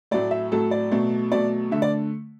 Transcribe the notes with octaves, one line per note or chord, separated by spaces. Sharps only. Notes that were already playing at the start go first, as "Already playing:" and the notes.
A2 F#3 A3 D5
E5
A2 F#3 A3 A4
D5
B2 F#3 A3
B2 F#3 A3 D5
D3 A3 E5
D5